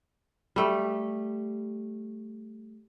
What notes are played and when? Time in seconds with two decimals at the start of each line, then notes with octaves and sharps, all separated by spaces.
0.56 G3 A3